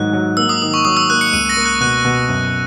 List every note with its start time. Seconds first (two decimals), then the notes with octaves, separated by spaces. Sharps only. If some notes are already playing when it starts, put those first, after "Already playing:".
Already playing: G#2 D#3 F#3 F#6
0.13 F#3
0.37 A#3 E6
0.49 D#6
0.62 D#3 D#6
0.74 C#6
0.85 F#3 D#6
0.97 E6
1.10 A#3 F#6
1.21 C#7
1.33 C#2 D#7
1.49 A#6
1.57 A#3
1.66 F#6
1.80 B2 F#6
2.05 B2
2.28 F#2